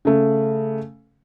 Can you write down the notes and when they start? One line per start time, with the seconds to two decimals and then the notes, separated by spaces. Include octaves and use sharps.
0.05 C#3 A3